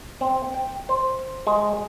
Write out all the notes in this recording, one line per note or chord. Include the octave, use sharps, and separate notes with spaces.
C4
G5
C5
G#3